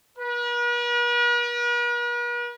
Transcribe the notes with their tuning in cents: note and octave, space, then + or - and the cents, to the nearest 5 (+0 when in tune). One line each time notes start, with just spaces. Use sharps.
B4 -45